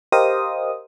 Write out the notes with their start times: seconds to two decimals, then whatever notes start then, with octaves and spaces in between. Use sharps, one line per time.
0.12 G4 A#4 C5 D#5 F5 D#6